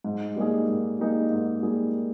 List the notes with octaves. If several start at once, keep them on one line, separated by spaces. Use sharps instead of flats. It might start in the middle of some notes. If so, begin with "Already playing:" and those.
G#2
G3 A#3 D#4 G#4
G#2
G3 A#3 D#4 G#4
G#2
G3 A#3 D#4 G#4